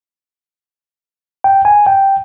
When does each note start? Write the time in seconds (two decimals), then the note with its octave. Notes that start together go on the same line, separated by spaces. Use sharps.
1.44 G5
1.65 G#5
1.86 G5